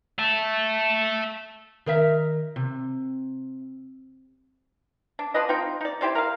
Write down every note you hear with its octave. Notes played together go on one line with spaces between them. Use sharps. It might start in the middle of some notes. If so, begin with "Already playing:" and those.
E5 A5
D#3 A#4 E5
C3
D4
F3 D4 B4 D#5
C4 D#4 F4 G5
D#4 D5
E4 G4 C5 D5
A#4 F5